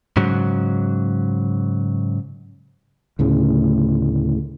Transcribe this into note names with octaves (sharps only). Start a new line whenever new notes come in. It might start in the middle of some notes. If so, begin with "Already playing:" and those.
G#2 C#3 F#3
D2 A2 C#3